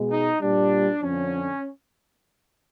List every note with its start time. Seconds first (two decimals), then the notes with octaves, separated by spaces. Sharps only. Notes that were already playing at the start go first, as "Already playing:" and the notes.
Already playing: B2 G#3
0.11 D#4
0.42 A#2 G3 D4
1.02 F2 D3 F3 C#4